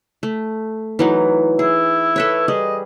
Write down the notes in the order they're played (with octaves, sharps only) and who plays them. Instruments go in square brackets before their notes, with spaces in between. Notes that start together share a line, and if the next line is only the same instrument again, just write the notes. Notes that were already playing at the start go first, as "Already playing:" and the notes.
[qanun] A3
E3 F#3 D#4
[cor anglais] E4 [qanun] G#4
[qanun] A4 B4 C#5
[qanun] G3 G#4 [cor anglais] D#5